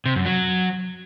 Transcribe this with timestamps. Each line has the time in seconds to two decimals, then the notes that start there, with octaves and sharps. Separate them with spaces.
0.06 C3
0.16 F#2
0.26 F#3